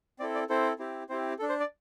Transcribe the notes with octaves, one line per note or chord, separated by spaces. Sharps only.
C4 E4 A4 D5
D5
C4 E4 A4 C5
C4 E4 G4
C4 E4 G4 C5
A4
D4
C5
D5